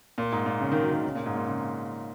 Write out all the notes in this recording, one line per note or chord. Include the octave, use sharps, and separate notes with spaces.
A#2
G#2
A#2
C#3
D#3
F#3
D#3
C#3
A#2
G#2
A#2
C#3